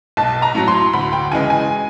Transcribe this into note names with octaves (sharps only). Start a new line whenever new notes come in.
B1 A5
A#5
A2 F#3
C6
D2 B5
G5
C#3 E3 G#3 G#5
G#5